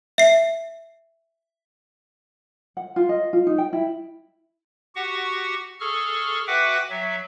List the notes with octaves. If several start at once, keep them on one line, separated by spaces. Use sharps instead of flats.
E5 C7
F#5
F4
D#5
F4
D#4
G5
E4
F#4 G4 F#5 C#6
G#4 A4 C#6 F6
F#4 B4 E5 F#5 G5 D6
F#3 E5